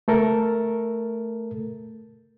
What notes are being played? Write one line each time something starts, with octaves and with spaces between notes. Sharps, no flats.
A3 A4 A#4